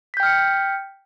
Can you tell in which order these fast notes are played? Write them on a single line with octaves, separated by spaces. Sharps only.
B6 G6 G5 F6 C#7